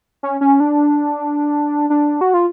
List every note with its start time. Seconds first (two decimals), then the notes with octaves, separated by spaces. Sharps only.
0.23 C#4
0.41 C#4
0.60 D4
1.90 D4
2.21 F#4
2.34 F4